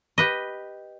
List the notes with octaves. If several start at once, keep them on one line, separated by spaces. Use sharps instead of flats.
G4 B4 D#5